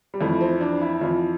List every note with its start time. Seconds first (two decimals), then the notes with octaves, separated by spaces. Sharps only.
0.14 G3
0.21 F2 E3 A3
0.41 C4
0.61 D4
0.82 E4
1.01 F2 E3 F4